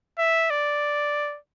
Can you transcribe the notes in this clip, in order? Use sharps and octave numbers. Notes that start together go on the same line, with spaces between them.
E5
D5